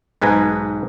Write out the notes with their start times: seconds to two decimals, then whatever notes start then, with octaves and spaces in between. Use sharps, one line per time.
0.22 B1 G#2 B4 G#5 A#5